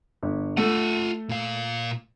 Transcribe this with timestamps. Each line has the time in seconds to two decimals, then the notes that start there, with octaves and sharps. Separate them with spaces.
0.23 G1
0.57 A3 F4 A4 F#5 D#7
1.29 A#2 F5